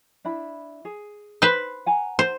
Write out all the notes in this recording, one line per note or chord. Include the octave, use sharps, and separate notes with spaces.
D4 E4 B5
G#4
B4 C5
F#5 G#5 A#5
C5